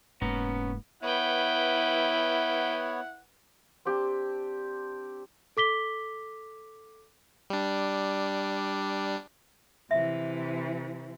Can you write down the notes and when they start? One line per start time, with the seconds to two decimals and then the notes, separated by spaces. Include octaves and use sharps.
0.21 F1 G#2 A#3 B3 C#4 A#5
1.03 B3 E4 B4 C#5 F#5 G5
3.85 C4 D4 G4
5.57 A4 D6 B6 G7
7.50 G3 D4
9.91 C3 E3 E5